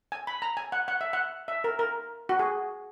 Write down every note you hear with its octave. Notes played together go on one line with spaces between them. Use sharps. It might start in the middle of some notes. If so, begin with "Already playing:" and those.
G#5
B5
A#5
G#5
F#5
F#5
E5
F#5
E5
A#4
A#4
F#4
G#4